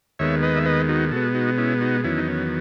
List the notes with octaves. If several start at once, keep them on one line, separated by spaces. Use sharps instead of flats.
D#2 D#3 G#3 B3 C#5 E5
B4 D#5
E5
B4 D#5
D#4 F#4
B2 G#3 B3 F#4 A4
D#4 F#4
C#4 E4
D#4 F#4
E2 D#3 F#3 B3 C#4 E4
D#4
C#4